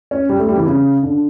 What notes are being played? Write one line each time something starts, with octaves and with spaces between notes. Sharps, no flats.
C#4
G3
A3
G3
E3
C#3
D3